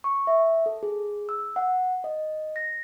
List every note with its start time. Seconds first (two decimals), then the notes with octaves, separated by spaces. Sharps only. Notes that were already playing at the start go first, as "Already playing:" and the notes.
0.04 C#6
0.27 E5
0.66 A4
0.83 G#4
1.29 E6
1.56 F#5
2.04 D#5
2.56 A#6